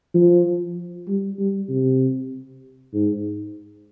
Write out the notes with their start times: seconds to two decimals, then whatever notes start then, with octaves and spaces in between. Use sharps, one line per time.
0.14 F3
1.07 G3
1.38 G3
1.69 C3
2.93 G#2